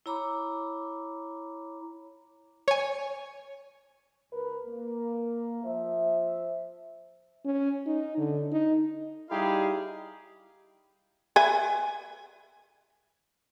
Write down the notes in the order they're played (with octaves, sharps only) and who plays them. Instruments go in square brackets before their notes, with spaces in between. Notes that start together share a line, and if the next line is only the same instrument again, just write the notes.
[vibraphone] E4 C#5 A#5 B5 D6
[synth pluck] C#5 G#5
[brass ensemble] C#2 A#4 B4
A#3
F3 C5 E5
[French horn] C#4
D#4
D3
D#4
[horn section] G3 D#4 E4 G4 G#4 F5
[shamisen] B4 E5 G#5